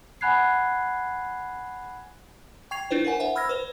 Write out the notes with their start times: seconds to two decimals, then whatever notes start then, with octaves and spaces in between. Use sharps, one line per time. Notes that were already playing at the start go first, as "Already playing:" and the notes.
0.21 F#5 G#5 B5 F#6 G#6 C7
2.71 G5 C#6 G#6 C7 F7
2.91 D4 E4 B4 C5
3.05 A#4 B4 F#5 G#5
3.20 C5 E5 F#5
3.35 B5 E6 F6 G#6 A#6
3.49 B4 C5